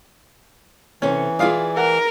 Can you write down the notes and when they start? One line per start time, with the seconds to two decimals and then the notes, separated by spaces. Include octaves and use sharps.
1.02 C3 E3 C#4 A4
1.39 E4 F4 G#4 D5 F5 D#6
1.77 A#4 F#5